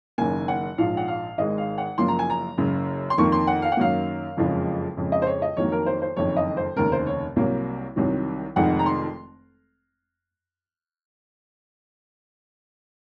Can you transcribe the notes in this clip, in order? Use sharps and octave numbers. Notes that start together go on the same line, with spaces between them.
F#1 F#2 D#3 A#3 G#5
F#5
A#1 G#2 F3 F5
F#5
F5
G#1 G#2 D#3 G#3 D#5
F5
F#5
F#1 F#2 F3 A#3 C6
A#5
G#5
A#5
F#1 F#2 C#3
C6
F2 D#3 A#3 C#6
C6
F#5
F5
F#5
F#2 D#3 F#3 A#3 F5
F#1 F2 C#3 F3 G#3
F2 C#3 G#3
D#5
C5
C#5
D#5
F2 D#3 F#3 A#3 C#5
A#4
C5
C5
F#1 F2 D#3 C#5
D#5
C5
F1 D#2 C#3 A#4
C5
C#5
C2 C3 F#3 A#3
C2 C3 D#3 F#3
F1 F2 D#3 G#3 F#5
A#5
C6